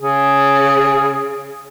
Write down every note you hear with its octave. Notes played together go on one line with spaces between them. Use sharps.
C#3 G#4